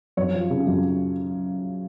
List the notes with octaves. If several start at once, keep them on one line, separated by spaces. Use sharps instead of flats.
F#2 C#5
F3
C#3
F#2